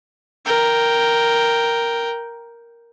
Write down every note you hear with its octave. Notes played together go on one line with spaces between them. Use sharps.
A#4 G5